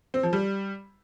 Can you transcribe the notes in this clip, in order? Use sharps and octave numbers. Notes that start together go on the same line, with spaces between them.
C4
F3
G3